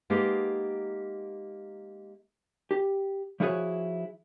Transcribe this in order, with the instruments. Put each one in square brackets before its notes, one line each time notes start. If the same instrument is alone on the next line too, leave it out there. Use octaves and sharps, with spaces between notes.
[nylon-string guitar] G#3 A#3 B3 D#4 G4 G#4
[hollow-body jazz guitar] G4
F3 E4 F#4 G#4 A#4 C#5